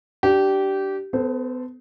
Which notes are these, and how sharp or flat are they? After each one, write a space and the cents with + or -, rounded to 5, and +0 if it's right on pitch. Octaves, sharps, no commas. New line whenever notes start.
D4 +0 G4 -20
B3 +35 A4 +0 C5 +0